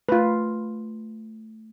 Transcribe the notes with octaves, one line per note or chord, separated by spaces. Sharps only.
A3 F4 B4